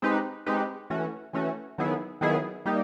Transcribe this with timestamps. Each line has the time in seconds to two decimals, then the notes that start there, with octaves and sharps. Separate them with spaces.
0.02 G#3 C4 D#4 G4 B4
0.46 G#3 C4 D#4 G4 B4
0.90 E3 A3 C#4 F#4
1.33 E3 A3 C#4 F#4
1.78 D#3 F#3 B3 E4 G#4
2.21 D#3 F#3 B3 E4 G#4
2.66 G3 A#3 D#4 G4